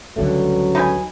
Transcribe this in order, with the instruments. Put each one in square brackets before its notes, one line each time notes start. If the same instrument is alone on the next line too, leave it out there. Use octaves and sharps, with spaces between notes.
[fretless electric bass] C#2 D3 A3 [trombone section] G2 F#3
[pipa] D#4 B4 G#5